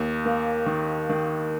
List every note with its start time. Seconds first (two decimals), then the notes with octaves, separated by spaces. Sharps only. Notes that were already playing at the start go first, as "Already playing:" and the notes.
Already playing: D#2
0.25 A#3
0.66 D#3
1.09 D#3